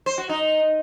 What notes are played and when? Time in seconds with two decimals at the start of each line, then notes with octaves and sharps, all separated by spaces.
0.06 C5
0.18 F#4
0.29 D#4